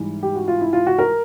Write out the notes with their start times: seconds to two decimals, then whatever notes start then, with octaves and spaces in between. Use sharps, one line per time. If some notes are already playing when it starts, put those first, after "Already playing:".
Already playing: G#2 E3 G3
0.23 G4
0.36 F#4
0.48 F4
0.61 E4
0.73 F4
0.87 F#4
0.99 A#4